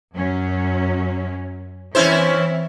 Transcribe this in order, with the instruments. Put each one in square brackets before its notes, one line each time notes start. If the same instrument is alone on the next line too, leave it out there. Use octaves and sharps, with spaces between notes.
[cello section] F#2 F#3 C#4
[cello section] E3 C4 [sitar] C#4 E4 C5